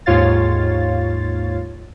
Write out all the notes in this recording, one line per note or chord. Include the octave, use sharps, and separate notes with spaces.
D#2 G#2 F4 C#5 F5 A6